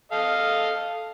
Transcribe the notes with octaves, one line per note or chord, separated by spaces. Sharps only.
A4 D#5 F5